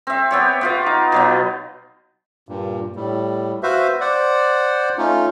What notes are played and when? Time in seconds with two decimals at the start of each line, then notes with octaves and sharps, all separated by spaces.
0.07 C4 E5
0.31 B3 G4 C#5
0.61 B3 F4 F5
0.86 D#4
1.12 B2 F#3 B3
2.49 G2 A#2
2.96 A2 G3
3.63 F#4 B4 C5 E5 F5
4.01 C5 D5 F#5
4.98 A3 C#4 D#4 F4